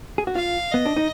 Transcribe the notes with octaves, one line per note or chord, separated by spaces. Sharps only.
G#4
F#4
F4 F5
B3 D#5
D4
D#4